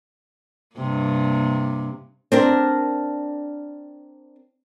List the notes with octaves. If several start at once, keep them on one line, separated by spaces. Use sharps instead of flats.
G2 C3 A#3
C4 D4 A#4